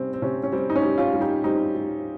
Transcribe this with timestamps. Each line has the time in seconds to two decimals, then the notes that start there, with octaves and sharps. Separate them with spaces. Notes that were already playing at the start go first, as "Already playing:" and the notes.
Already playing: C3 G3 C4 C#4
0.13 C4
0.22 C3 C#4
0.43 C#4
0.52 G3 C4
0.70 D#4
0.76 C#4
0.83 G3
0.98 C#4 F4
1.14 G3
1.21 D#4 G4
1.44 G3 C4 D#4
1.75 G3